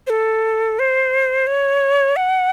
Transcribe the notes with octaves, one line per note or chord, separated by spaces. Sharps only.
C5
A4
C5
C#5
F#5